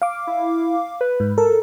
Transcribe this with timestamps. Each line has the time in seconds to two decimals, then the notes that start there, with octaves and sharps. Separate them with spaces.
0.02 F5 D6
0.27 E4
1.01 B4
1.20 G#2
1.38 A4 A#4